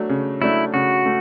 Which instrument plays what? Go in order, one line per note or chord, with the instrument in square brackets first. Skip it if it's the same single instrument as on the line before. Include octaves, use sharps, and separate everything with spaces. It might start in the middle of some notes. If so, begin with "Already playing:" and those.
Already playing: [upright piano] F#3 A3 D4
C#3
[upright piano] F#3 A3 D4 [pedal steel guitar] E4
[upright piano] C#3 [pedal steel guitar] F#4
[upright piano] A3